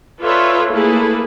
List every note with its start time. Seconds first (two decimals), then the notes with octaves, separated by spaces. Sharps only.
0.20 F4 A4 B4 C#5 D5 E5
0.71 A3 A#3 E4 G#4 A4 B4